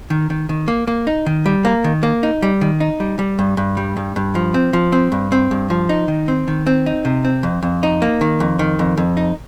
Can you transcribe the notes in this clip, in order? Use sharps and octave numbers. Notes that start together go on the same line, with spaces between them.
D#3
D#3
D#3
A#3
A#3
D#4
D#3
G3
A#3
D#3
A#3
D#4
G3
D#3
D#4
G3
G3
G2
G2
G3
G2
G2
F3
C4
F3
C4
G2
C4
G2
F3
D#4
D#3
C4
D#3
C4
D#4
C3
C4
F2
F2
D#4
A#3
D#3
F2
D#3
F2
F2
D#4